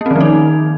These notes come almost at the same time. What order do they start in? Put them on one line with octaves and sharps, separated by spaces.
A#3 C4 D#3 F3 D#4